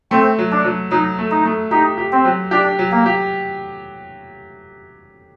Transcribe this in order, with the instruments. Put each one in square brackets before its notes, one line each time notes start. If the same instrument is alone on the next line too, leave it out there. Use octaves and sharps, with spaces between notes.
[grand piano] A3 [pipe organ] C4
[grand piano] F#3
[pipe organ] D4
[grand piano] F#3
[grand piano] F#3 [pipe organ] D#4
[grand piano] A3
[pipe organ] D#4
[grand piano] A3
[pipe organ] D#4 [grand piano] G4
[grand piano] G4
[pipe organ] C4
[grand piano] F#3
[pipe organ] D4 [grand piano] G4
[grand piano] F#3
[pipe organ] A#3
[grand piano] G4